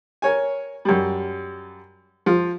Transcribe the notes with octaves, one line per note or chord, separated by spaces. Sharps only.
A#4 C#5 G#5
F#2 G3
F3